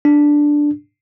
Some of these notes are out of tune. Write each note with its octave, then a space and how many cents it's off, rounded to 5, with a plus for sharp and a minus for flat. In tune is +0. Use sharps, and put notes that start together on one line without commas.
D4 +0